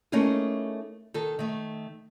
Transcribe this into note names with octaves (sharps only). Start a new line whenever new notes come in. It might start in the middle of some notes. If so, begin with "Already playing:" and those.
A3 A#3 C#4 D#4 E4 G#4
D#3 A4
D#3 A3